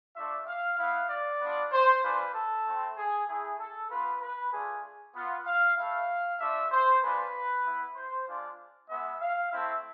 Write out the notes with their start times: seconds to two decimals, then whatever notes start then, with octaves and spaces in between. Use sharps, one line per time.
0.16 A3 D4 F4 E5
0.47 F5
0.79 B3 E4 F5
1.10 D5
1.41 B3 D4 F4
1.72 C5
2.03 G#3 D4 F4 B4
2.34 A4
2.66 A3 C4 E4
2.97 G#4
3.28 A3 E4 G#4
3.59 A4
3.90 B3 F4 B4
4.21 B4
4.53 A3 D4 F4 G#4
5.15 B3 F4
5.46 F5
5.77 A3 E4 F5
6.40 A3 D4 F4 E5
6.71 C5
7.02 G#3 D4 F4 B4
7.64 B3 E4
7.96 C5
8.28 G#3 D4 F4
8.89 G#3 B3 E4 E5
9.21 F5
9.52 A3 C4 E4 E5